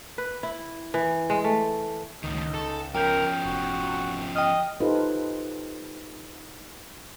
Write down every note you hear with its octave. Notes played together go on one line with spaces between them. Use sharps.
B4
E4
E3
G#3
A3
C#2 A2 D#3 D#4
A4
F3 C#4 A#4 G5 G6
F1 F#4
D#5 G5 F6
D#4 F4 G4 A4 B4 C5